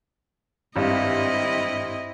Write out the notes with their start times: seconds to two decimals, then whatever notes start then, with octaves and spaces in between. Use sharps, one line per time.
0.76 G#1 G2 C4 E4 D#5